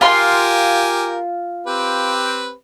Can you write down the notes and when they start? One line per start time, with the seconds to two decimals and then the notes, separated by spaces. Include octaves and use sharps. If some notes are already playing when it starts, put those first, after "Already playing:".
0.01 F4 G4 A#4 F5 G#5 C6
1.67 C4 G4 B4